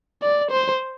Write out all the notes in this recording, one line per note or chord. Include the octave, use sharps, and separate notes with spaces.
D5
C5